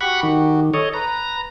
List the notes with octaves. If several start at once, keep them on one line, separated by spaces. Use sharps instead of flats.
F#4 G4 F#5 B5 C#6
D#3
A4 C#5 D#5
B4 A#5